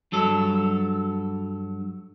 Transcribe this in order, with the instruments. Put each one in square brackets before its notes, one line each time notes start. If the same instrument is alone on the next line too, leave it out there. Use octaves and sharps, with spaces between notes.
[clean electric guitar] G2 F#3 A4